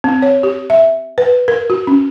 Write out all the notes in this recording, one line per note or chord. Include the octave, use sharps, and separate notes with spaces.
C4
C#5
G4
E5
B4
A#4
F#4
C#4